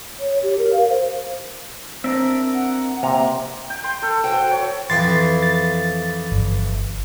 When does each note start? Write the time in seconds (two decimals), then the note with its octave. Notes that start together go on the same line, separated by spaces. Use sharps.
0.20 C#5
0.43 G4
0.59 A#4
0.73 F5
0.89 C5
2.04 C4 D4 A#4 E5
2.54 F#5
3.03 C3 A#3 A#5
3.70 G5
3.84 C6
4.02 A4
4.24 F#4 C5 G5
4.51 C#5
4.90 F2 E3 C6 A6
5.42 A6
6.31 G1